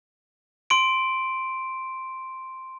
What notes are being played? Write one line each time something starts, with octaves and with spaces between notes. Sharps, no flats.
C6 D7